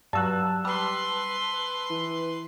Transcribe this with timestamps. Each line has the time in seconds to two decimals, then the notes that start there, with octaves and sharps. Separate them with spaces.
0.13 G2 F#3 A5 E6 F#6
0.65 G3 B4 C6
1.90 E3